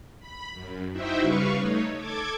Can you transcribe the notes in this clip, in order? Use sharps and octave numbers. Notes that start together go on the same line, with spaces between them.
B5
F#2
D#4 E4 F#4 C5 E5 G5
C#3 G3 B4 F5 C#6
A3 D#4 C#5
A4 D6 G#6